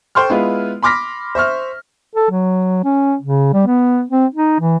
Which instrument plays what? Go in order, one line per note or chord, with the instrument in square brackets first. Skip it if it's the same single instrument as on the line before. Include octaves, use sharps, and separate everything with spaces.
[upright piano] A4 C5 G5 C6 C#6 F6
G#3 B3 E4 F4 B4
B5 C6 D6 F6 A#6 B6
C5 E5 C#6 F6
[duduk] A4
F#3
C#4
C#3
G3
B3
C4
D#4
E3